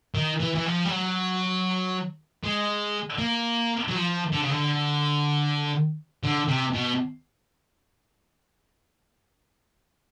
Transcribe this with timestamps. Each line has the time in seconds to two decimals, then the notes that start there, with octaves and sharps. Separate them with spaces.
0.15 D#3
0.40 E3
0.55 E3
0.66 F3
0.85 G3
0.90 F#3
2.44 G#3
3.19 A#3
3.88 F#3
3.95 F3
4.32 D3
4.42 C#3
4.51 D3
6.23 D3
6.48 C3
6.74 B2